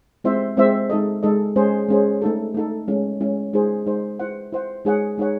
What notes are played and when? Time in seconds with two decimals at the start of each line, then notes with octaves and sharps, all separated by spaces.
0.24 G#3 C4 E4 C5 E5
0.57 G#3 C4 E4 C5 E5
0.90 G#3 D#4 A4 D#5
1.23 G#3 D#4 A4 D#5
1.56 G#3 C#4 G#4 C5
1.88 G#3 C#4 G#4 C5
2.22 A3 D#4 A4
2.54 A3 D#4 A4
2.88 G#3 C#4 E4
3.21 G#3 C#4 E4
3.53 G#3 D#4 G#4 C5
3.86 G#3 D#4 G#4 C5
4.19 E4 C5 F#5
4.52 E4 C5 F#5
4.85 G#3 D#4 G#4 C#5 F#5
5.18 G#3 D#4 G#4 C#5 F#5